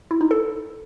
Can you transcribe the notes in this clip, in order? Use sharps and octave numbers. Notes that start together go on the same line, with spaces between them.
E4
D#4
A4